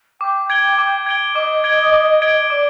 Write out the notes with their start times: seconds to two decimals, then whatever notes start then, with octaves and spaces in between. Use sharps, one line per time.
0.21 G5 D6
0.50 G#6 D7 G7
0.78 D6
1.06 G#6 D7 G7
1.35 D#5 D6
1.64 G#6 D7 G7
1.93 D6
2.22 G#6 D7 G7
2.50 D5 D6